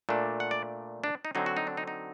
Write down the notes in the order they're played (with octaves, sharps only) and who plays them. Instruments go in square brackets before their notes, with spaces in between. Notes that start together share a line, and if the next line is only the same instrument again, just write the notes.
[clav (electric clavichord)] A#2 A3 D4
F#5
D5
D4
D#4
D3 F#3 C4 D#4
F#4
D#4
D4
D#4
D#4